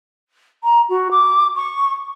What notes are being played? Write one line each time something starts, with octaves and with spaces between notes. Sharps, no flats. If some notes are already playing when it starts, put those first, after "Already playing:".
A#5
F#4
D6
C#6